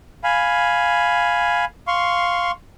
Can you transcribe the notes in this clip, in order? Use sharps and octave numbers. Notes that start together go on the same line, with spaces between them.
F5 G#5 B5
F5 C6 C#6